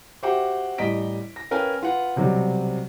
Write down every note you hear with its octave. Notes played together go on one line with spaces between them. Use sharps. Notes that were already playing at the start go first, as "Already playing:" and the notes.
F#4 G4 C5 E5 F#5 G5
A1 G3 D#5 A#5 B6 D7
A#6
C#4 A#4 B4 F5 G5 G#5
F4 B4 F#5
B1 C3 F#3 G3